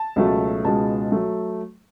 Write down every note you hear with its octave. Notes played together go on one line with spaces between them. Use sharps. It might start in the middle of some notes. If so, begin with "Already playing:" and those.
Already playing: A5
C#2 B2 F#3 A3
C#2 B2 G#3 A5
F#3 A3